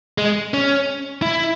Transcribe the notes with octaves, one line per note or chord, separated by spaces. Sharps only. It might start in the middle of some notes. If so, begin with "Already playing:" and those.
G#3
C#4
E4